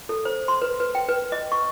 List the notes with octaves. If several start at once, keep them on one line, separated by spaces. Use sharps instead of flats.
A4
C5
C6
B4
B4
G5
B4
D#5
C#6